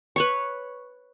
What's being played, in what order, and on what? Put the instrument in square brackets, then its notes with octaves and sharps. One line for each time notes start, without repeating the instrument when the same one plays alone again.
[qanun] B4 C#5 C#6